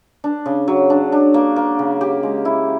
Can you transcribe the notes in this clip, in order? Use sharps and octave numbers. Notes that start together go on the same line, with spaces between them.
D4
C#3
F#3
D4
D4
A#3
A#3
C#3
G4
G#3
E4